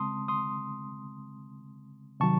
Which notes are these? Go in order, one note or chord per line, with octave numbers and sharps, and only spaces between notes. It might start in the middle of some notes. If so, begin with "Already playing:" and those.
Already playing: C#3 G#3 C4 A5 C6 D#6
C6 D#6
C3 D#3 F#3 A5 C#6